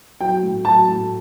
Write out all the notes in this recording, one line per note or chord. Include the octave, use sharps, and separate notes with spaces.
F#3 G5
A2
F#3 A5
A2